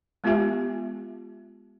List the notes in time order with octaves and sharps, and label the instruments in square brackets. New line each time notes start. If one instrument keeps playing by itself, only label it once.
[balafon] G#3 B3 F4 G4 E5 G#5